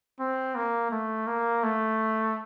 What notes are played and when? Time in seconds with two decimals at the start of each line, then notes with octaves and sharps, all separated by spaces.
0.19 C4
0.56 A#3
0.91 A3
1.27 A#3
1.63 A3